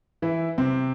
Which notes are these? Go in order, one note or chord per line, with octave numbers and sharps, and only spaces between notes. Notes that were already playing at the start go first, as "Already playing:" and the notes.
E3 E4
C3 C4